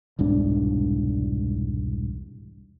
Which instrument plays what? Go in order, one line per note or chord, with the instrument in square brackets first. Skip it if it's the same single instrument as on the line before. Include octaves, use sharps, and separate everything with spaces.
[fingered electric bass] E1 C2 G#2 D4